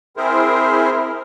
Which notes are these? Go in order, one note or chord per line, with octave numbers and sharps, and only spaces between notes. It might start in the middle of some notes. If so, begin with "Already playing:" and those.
C4 E4 G#4 A#4 C5